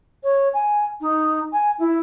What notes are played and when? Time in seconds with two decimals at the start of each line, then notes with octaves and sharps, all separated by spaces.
0.23 C#5
0.54 G#5
1.01 D#4
1.52 G#5
1.79 E4